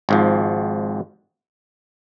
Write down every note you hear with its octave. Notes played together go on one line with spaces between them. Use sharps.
G#1 G#2 F3